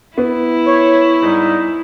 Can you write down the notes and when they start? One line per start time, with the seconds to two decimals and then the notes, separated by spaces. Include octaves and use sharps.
0.18 B3 E4
0.66 C#5
1.22 G#2 G3 D#4